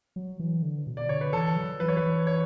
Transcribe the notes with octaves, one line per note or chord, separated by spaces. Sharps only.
F#3
E3
D3
B2
D5
D3 C#5
B4
E3 A4
F#3
E3 B4
C#5
B4
E3
C#5